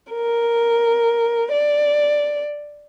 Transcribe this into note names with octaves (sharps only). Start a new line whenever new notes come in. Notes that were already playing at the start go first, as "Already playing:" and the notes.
A#4
D5